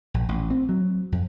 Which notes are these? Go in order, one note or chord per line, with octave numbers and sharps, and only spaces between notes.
A#1
A1
C4
F#3
F2